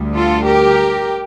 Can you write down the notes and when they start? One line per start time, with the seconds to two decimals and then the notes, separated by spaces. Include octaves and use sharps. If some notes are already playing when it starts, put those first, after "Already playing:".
Already playing: D2 D3 G3
0.15 F4 A4
0.45 G4 A#4